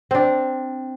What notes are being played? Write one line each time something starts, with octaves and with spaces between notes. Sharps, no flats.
C4 D4